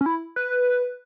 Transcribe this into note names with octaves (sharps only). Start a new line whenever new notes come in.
C#4
E4
B4